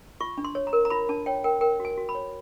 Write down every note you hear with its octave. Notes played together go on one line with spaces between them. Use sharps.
F4 C#6
D4
C6
C#5
A#5
A#4
A#5
F4 B5
D4 A5
C#5 G5
A#4 G5
A#4 G5
F#4
G#5
F#4
B5
C#5